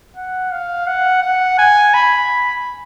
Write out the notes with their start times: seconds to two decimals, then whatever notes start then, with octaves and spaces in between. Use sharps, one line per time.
0.17 F#5
0.52 F5
0.87 F#5
1.22 F#5
1.59 G#5
1.94 B5